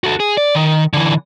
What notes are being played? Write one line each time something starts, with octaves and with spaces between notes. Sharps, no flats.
F#4 A4
G#4
D5
D#3
D3 E3